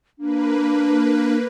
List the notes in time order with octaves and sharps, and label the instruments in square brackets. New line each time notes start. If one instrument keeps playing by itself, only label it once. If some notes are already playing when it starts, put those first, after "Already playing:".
[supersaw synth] A#3 B4 [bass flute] D4